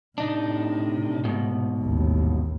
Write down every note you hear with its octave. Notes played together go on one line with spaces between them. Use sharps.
A2 C3 D4 D#4
G#2 B2
A1 D#2